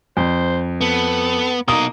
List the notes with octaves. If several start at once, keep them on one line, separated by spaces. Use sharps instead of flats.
F2 C5
B3 A4
B2 A#3 D#4 D#6